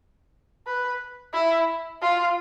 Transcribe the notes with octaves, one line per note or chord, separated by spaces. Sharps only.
B4
E4
F4